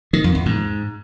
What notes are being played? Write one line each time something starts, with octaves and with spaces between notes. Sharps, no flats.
D#3
F2
E2
G#2